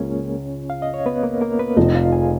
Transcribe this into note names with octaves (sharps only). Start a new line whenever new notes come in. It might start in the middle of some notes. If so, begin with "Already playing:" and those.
Already playing: C#2 G#3 A#3 C#4 F4 G#4 A#4 C#5
F5
D#5
C#5
B3 B4
A#3 A#4
A#3 A#4
B3 B4
F1 F2 F3 D#4 D#5
F4 F5
G#4 G#5